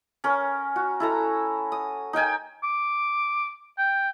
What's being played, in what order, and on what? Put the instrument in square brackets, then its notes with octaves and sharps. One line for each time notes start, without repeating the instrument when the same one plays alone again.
[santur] C#4 A#4
F#4
E4 A4 A#5
D#6
D#4 A#4 G5 G#5
[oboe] D6
G5